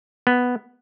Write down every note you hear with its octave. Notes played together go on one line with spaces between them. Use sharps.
B3